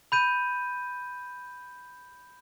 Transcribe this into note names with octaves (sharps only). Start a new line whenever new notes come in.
B5 G6 D#7